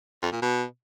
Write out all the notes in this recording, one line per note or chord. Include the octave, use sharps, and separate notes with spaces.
F2
A#2
B2